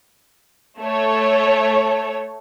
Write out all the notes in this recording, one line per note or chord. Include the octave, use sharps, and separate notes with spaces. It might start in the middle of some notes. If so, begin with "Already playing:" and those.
A3 C#5